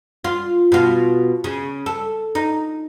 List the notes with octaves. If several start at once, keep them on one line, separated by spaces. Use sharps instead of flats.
F4
B2 F4
C#3
A4
D#4